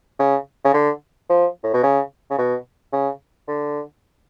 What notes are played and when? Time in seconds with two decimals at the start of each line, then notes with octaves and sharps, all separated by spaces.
0.19 C#3
0.64 C#3
0.74 D3
1.29 F3
1.63 A2
1.73 B2
1.83 C#3
2.31 C#3
2.38 B2
2.92 C#3
3.48 D3